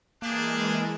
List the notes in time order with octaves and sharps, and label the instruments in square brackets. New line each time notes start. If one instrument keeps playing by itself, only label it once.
[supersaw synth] E3 G#3 [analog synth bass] A#3 [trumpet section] D4 G4 G#4